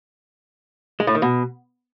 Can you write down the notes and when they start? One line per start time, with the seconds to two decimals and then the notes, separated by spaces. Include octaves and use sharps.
1.00 G#3
1.07 A2
1.15 D#3
1.22 B2